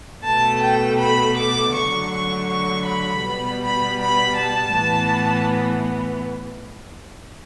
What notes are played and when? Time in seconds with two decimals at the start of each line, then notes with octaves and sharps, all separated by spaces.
0.23 B2 A3 A5
0.61 G5
0.98 B5
1.35 D6
1.73 D3 F#3 A3 C#6
2.10 C#6
2.48 C#6
2.86 B5
3.23 B2 G3 B3
3.61 B5
3.98 B5
4.36 A5
4.74 A2 E3 B3